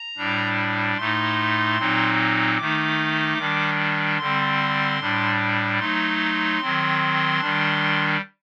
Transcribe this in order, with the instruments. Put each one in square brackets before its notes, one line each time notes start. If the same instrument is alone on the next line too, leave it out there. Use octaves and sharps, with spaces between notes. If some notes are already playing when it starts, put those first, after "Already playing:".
Already playing: [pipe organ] A#5
A2 G3 D4
A2 A3 D#4 C6
A#2 F#3 C4 D#4
D#3 A3 D#4 D6
D#3 G3 D4
D3 G3 C4 C6
A2 G3 D4
F#3 A3 D#4 C6
D#3 F#3 C4
D#3 G3 D4